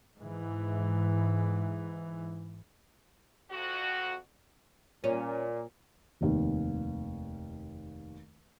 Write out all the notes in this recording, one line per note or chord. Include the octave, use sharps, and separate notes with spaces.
G#2 E3
F2 F#4
A#2 C#4
F1 D#2